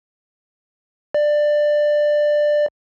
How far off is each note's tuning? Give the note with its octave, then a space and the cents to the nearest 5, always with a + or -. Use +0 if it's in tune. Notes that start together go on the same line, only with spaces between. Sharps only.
D5 +15